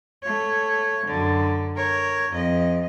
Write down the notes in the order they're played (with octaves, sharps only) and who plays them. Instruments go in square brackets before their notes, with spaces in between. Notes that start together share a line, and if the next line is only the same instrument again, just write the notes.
[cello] A3 C#5
F#2 D3
A#4 C#5
F2 D#5